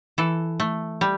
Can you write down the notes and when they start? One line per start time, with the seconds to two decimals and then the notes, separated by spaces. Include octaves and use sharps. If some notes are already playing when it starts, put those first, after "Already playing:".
0.18 E3 A4
0.60 A3
1.01 G3